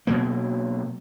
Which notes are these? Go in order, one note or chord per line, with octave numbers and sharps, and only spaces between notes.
B2 F#3 A#3